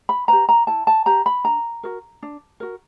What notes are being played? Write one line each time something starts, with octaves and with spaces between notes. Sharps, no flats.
B5
G4 B4 A#5
A#5
E4 A5
A5
G4 B4 A#5
B5
D4 A#5
F#4 A#4
D4
F#4 A#4